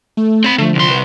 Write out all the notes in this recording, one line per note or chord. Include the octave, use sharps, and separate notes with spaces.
A3
C4 B5
D3 F3 A3
C2 C6
B4 F#5